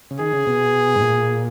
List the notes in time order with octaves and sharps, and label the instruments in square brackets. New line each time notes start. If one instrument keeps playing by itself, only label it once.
[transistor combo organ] C#3
[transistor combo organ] D#3 [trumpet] G#4
[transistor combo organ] C#3
B2
G#2
A#2